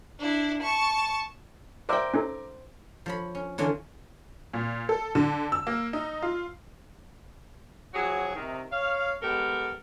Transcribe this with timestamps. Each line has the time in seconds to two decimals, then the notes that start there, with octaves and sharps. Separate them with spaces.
0.19 D4 E4
0.62 A5 C#6
1.89 A#4 C5 D5 E5 G5
2.14 C#4 D#4 A4
3.06 F3 C#5 B5
3.35 C#4
3.58 D3 E3 C#4 D4 F4
4.54 A#2
4.89 A4
5.15 D3
5.52 E6
5.67 A#3
5.93 D#4
6.22 F4
7.93 C#3 F3 F#3 F#4 G#4
8.35 C3 D#3
8.72 C#5 F5
9.22 G#3 B3 G4 A4 A#4